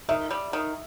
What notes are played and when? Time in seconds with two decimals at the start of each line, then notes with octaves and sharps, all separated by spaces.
0.09 D#3 E5
0.31 G3
0.53 D#3